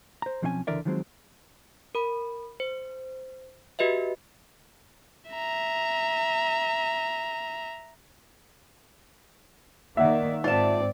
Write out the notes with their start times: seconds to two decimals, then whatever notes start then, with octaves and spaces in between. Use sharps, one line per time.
0.22 C5 A#5
0.42 B1 F3 C4 C#4 F5 G#5
0.67 C#2 D3 E3 A#4 D5 E5
0.85 D#3 F3 F#3 G#3 C4
1.95 A#4 B5
2.60 C5
3.79 F#4 G4 B4 D#5 E5
5.31 E5 A#5
9.97 D#3 A#3 D5 E5 F#5
10.44 G#2 C4 F4 D5 A5